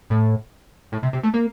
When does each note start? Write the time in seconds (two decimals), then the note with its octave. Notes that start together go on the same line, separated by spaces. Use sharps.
0.10 A2
0.92 A2
1.03 C3
1.13 C3
1.23 A3
1.34 A#3